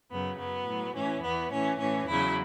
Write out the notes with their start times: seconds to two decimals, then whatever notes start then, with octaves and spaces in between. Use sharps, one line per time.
0.10 F#2 C#3 F#3 B3
0.38 F#2 F#3 B3
0.66 A2 F#3
0.94 A2 E3 C#4
1.22 E2 E3 B3
1.51 A2 E3 C#4
1.79 A2 E3 C#4
2.07 E2 C#3 F#3 E4